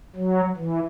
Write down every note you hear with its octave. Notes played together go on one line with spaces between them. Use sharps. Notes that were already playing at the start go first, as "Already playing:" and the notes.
F#3
E3